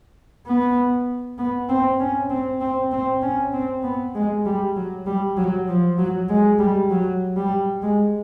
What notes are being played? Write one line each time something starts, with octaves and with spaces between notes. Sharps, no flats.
B3
B3
C4
C#4
C4
C4
C4
C#4
C4
B3
G#3
G3
F#3
G3
F#3
F3
F#3
G#3
G3
F#3
G3
G#3